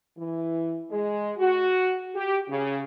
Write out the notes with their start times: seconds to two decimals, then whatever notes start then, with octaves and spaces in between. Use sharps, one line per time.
0.17 E3
0.89 G#3
1.37 F#4
2.15 G4
2.48 C#3